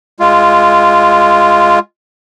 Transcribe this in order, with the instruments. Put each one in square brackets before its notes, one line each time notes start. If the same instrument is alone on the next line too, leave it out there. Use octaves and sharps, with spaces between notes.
[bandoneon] G#3 F4